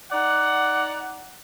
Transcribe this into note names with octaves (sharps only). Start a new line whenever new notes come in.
D#4 D5 F#5